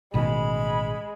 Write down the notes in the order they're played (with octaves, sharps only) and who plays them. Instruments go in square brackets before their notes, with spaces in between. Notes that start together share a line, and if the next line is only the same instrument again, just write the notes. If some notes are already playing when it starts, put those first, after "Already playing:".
[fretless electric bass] A1 B2 D#3 [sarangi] G#3 [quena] B5